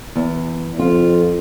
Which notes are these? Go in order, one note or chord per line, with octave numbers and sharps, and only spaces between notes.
E2
F2 F4